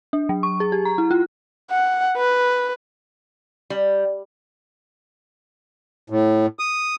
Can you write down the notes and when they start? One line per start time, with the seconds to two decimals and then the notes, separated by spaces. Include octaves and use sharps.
0.13 D4
0.29 F#3
0.43 C#6
0.60 G#4
0.72 G4
0.85 A#5
0.98 E4
1.11 F4
1.71 F#5
2.17 B4
3.70 G3
6.10 A2
6.59 D#6